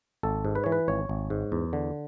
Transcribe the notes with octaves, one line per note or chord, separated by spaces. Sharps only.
G#1 A4
G#2
B4
E3 C#5
B4
G#1 C#5
G#1
G#2
E2
D3